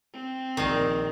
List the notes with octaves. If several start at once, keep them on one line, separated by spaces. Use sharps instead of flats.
C4
A#1 D#3 D#4 D5 C7